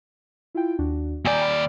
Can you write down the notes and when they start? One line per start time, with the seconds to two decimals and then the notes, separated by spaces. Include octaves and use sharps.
0.55 E4 F4 G5
0.79 D#2 D4 F#4
1.25 D#2 D5 G#5 A#5 G6
1.41 G5 B5 F6